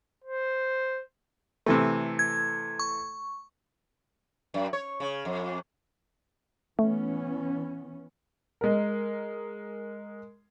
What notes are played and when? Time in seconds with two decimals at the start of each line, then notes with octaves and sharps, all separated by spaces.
0.24 C5
1.66 C3 E3 A3
2.19 G#6
2.79 C#6
4.54 F#2
4.73 C#5
5.00 C#3
5.25 F2
6.79 E3 A3 B3 C#4
8.61 G#3 A#4